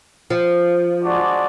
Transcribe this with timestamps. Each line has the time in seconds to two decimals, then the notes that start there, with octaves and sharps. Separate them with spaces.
0.30 F3
1.03 G#3 D4 F#4 D5